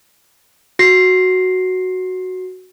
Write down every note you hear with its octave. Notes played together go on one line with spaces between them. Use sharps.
F#4 A#6 C7